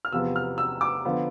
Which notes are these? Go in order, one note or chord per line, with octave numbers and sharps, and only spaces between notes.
F6
E2 C3 F3 B3 E6
F6
E6
D6
D3 F3 B3